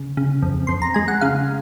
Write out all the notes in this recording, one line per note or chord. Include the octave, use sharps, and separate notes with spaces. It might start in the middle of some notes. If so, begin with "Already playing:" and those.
Already playing: C#3
C#3
F2
F2 C6
A#5
G#3 G#5
F#5
C#3 F5